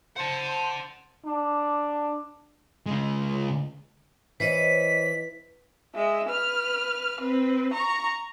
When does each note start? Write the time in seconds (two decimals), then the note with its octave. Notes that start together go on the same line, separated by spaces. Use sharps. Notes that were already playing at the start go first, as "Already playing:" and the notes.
0.16 C5 F#5 A5
1.26 D4
2.86 C#3 G#3
4.40 E3 C5 C#5 D#5 B6
5.95 G#3 E5
6.29 B4 F6
7.21 C4 B4
7.73 A#5 C#6